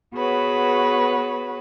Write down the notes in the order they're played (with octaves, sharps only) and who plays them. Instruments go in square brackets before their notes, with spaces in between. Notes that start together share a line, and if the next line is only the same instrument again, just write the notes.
[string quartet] B3 F#4 G#4 B4 C#5